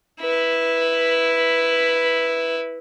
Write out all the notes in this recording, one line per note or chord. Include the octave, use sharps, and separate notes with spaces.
E4 B4